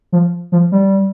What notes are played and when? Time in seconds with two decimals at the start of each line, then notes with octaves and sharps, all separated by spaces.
0.12 F3
0.52 F3
0.72 G3